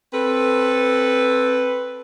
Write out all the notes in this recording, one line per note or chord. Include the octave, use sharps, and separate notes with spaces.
C4 A4 B4